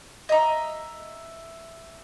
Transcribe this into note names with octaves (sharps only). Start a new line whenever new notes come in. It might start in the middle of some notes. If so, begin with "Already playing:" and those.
D#5 E5 A#5